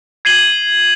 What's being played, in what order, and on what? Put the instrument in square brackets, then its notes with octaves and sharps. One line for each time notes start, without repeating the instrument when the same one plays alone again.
[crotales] G#6 C7 D#7 F#7 G7